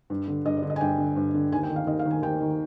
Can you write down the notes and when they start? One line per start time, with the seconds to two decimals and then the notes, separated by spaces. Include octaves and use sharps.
0.10 G2
0.28 D3
0.45 G2 D#5
0.57 D5
0.63 D3
0.70 D#5
0.76 G#5
0.81 G2 G5
0.98 D3
1.16 G2
1.34 D3
1.52 D#2 G#5
1.63 G5
1.70 D#3
1.76 F5
1.87 D#2 D#5
1.99 F5
2.05 D#3
2.11 G#5
2.22 D#2 G5
2.40 D#3